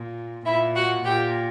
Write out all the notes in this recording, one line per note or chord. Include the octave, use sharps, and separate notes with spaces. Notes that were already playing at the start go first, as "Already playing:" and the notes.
Already playing: A#2
A#2 E4 E5
F#4 F#5
A#2 G4 G5